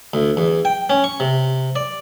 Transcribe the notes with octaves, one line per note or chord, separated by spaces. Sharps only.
D2
E2
G5
C#4
C#6
C3
D5